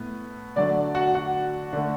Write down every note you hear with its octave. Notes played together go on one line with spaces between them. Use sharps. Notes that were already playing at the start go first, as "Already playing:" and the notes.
Already playing: A2 A3 B3 B4
D3 F#3 A3 D4 D5
F#4 F#5
F#4 F#5
D3 A3